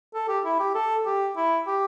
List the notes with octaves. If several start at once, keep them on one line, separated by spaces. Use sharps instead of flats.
A4
G4
E4
G4
A4
G4
E4
G4